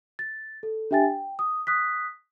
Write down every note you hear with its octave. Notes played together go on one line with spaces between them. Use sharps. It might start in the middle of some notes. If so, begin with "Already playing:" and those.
A6
A4
D4 G4 E5 G5 G#5 A6
G5
D#6
D#6 F#6 B6